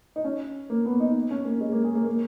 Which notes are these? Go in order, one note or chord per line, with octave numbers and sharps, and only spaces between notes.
D#4
C#4
A#3
B3
D#4
C#4
A#3
G#3
A#3
G#4
A#3
A#3